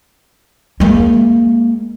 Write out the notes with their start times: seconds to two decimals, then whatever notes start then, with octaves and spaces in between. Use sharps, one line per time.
0.80 G#3 A#3